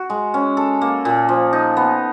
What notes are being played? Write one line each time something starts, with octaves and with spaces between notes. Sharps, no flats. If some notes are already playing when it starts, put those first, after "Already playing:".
Already playing: F#4
G#3
C#4
A4
A#3
A#2
F3
D#4
B3